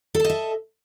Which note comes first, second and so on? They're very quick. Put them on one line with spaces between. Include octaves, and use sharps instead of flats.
A4 A5 D#5 E5